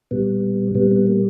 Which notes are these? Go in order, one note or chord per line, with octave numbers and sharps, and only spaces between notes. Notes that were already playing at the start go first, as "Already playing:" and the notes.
A#2 G3 B3
A#2 G3 B3
B3
A#3